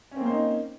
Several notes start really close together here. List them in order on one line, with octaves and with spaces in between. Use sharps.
C#4 C4 A#3 C5 D#4